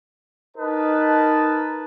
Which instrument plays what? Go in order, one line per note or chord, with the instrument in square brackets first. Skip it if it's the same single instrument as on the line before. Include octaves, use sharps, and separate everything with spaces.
[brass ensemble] D#4 A#4 B4 D#5 A5